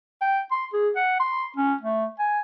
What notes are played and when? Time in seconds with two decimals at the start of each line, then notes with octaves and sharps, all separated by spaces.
0.21 G5
0.51 C6
0.73 G#4
0.96 F#5
1.20 C6
1.56 C#4
1.81 A3
2.19 G#5